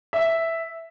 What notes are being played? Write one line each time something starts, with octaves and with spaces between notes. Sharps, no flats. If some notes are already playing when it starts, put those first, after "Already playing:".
E5